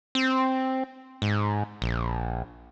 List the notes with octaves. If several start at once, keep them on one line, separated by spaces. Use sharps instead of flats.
C4
G#2
A#1